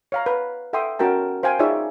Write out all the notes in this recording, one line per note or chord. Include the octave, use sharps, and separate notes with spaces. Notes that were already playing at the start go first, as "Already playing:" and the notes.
C#5 F5 A#5
B4
A4 E5 F#5 G5 C6 D#6
C#4 F#4 A#4 G5 A5
C5 F5 G5 G#5
D#4 F4 G#4 C#5 D5 E5